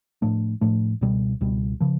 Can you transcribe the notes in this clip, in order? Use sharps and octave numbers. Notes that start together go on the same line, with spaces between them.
A2 F3 A3 D4
A2 F3 A3 D4
C#2 B2 G3
C#2 B2 G3
C#3 F3